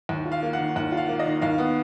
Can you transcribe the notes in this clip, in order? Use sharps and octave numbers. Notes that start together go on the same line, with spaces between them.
D#2
F4
F5
A#3
F#5
D#3
D#2 F#5
F4
F5
A#3
D#5
D#3
D#2 F5
B3